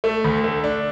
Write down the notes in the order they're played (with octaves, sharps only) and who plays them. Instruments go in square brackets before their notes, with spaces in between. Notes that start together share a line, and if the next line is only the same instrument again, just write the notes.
[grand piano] A3
D2
A3
D4